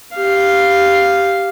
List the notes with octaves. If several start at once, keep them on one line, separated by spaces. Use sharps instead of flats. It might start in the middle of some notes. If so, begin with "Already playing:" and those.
G4 F5